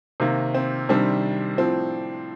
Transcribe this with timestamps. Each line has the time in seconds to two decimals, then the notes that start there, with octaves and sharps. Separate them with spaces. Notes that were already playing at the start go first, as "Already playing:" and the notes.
0.20 C3 D#3 A#3
0.54 C4
0.89 C3 D#3 G3 C4 D4
1.57 A2 F3 C4